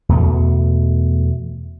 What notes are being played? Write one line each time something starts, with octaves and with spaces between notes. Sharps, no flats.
E2 B2 A3